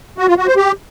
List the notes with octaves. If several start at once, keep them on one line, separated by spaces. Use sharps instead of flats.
F#4
F4
F#4
C5
G4